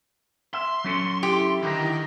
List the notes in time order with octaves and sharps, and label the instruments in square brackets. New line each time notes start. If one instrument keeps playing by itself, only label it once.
[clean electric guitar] E5 [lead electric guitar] C6
[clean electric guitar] F#3 C#4 A4
[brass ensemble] E4 [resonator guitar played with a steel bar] G4
[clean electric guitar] D3 A#5 [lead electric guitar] D#3